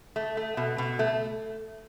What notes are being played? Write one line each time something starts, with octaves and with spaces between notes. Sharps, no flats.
A3
A3
B2
B2
A3